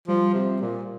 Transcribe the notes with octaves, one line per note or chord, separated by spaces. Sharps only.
F3 G3
C3
A#2